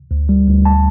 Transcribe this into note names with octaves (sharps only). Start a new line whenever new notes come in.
D2
G3
D2
A5